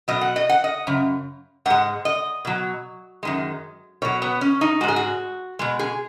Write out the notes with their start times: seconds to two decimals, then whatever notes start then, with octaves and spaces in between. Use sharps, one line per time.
0.08 B2 F#3 D#5
0.21 F#5
0.36 D#5
0.49 F#5
0.64 D#5
0.87 F#2 C#3
1.65 G#2 G#3 F#5
2.05 D#5
2.45 B2 F#3
3.23 F#2 D#3 G#3
4.02 B2 F#3 C#5
4.22 B3
4.41 C#4
4.61 D#4
4.81 G#3 F#4
4.84 G#2 G#4
4.96 F#4
5.59 B2 G#3
5.79 G#4